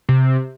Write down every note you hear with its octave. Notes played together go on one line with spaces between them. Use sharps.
C3